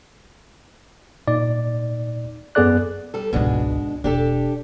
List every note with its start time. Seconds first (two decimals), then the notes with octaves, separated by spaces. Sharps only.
1.28 A#2 D#4 D5
2.55 F#2 B3 G#4 A4 D5 F#6
3.14 G3 A4
3.33 G#1 C#2 B2 G#3 D4
4.04 E1 D4 G4 A4